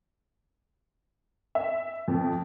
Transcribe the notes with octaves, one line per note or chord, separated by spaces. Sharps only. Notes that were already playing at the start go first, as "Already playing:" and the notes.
E5
F2